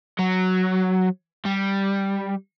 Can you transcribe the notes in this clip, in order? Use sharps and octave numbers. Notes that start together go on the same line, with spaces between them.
F#3
G3